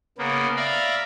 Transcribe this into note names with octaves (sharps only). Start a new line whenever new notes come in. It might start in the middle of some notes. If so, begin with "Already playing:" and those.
C#3 A#3 B3
D5 E5 F5 A#5 B5